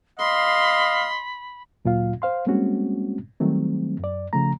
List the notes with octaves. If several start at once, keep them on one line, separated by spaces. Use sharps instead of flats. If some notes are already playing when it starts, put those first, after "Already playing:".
D#5 F5 B5 C6
D2 A#2 F#3 F4 F5
C5 F5 C6
G3 G#3 A#3 C4 C#4 F#4
D#3 F#3 G3 A3 C4
F#2 D5
C#3 F3 A3 A#5